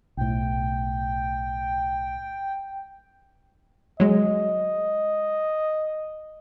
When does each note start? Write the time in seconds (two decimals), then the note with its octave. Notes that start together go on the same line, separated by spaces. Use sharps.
0.17 B1 A2 G5
4.00 F#3 G#3 D#5